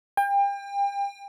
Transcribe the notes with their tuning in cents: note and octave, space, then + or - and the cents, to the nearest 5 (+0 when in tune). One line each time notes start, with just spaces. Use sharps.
G5 +35